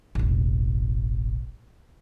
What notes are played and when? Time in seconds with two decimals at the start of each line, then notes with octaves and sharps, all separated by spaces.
0.15 E1 A1